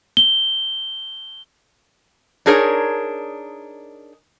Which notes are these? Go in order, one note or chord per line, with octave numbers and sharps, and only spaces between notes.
G7
D4 D#4 G#4 A#4 C#5